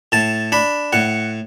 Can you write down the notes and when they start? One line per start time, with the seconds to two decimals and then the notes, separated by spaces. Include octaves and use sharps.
0.12 A2 A5
0.52 D4 B5
0.93 A2 F#5